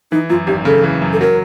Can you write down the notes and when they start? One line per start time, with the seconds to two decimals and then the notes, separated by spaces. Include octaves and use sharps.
0.12 E3 D#4
0.29 F#2 F4
0.47 G#1 G4
0.65 C#3 A4
0.84 E3
1.02 F#2
1.13 A4
1.21 F#3 A#4